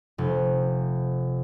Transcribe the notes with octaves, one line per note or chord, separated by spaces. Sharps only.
F1